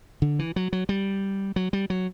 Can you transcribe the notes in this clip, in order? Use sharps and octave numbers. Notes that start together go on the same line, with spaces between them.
D3
E3
F#3
F#3
G3
F#3
G3
F#3